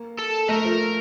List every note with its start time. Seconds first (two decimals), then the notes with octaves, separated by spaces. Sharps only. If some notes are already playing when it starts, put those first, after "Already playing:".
Already playing: A#3
0.19 A4
0.49 A3 A#4
0.65 F3